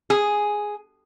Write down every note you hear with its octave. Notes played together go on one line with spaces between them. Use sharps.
G#4